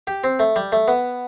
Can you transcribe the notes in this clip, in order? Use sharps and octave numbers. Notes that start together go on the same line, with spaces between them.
G4
C4
A3
G3
A3
B3